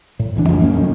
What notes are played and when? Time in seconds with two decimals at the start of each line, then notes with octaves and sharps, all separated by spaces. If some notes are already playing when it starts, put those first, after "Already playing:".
0.19 A2
0.35 D#1 C#2 E3 D4
0.49 A1 F2 C#3 F3
0.61 F#3 A#3 B3 C#4
0.74 E1 F2 A2 D#3